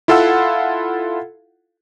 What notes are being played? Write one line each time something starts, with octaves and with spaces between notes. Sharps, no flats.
E4 F4 A4 F5 F#5 E6